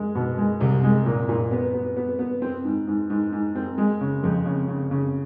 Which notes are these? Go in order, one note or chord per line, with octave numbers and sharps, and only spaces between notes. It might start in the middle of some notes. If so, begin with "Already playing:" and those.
Already playing: G#3
B2
G#3
C2
G#3
A#2
A#2
B3
B3
B3
B3
C4
G#2
G#2
G#2
G#2
C4
G#3
C#3
F2
C#3
C#3
C#3